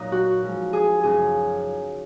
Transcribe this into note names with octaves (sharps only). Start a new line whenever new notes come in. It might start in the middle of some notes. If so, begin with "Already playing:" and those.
Already playing: A#2 F#3 D#4
F#4
G#2 F3
G#4
F#2 C#3 F3 G#4